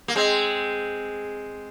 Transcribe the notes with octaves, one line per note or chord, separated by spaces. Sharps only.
A#3
G#3 C4